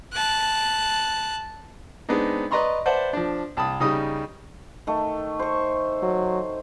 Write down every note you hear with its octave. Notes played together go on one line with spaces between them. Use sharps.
A5 F#6
G#3 B3 C4 D4 D#4
B4 D5 D#5 A#5 C6 C#6
B4 C5 D5 E5 F#5 A5
F3 D4
C2 A5 B5 D#6
C#3 G3 D#4 D#6
D#3 A3
C5 C#6
F#3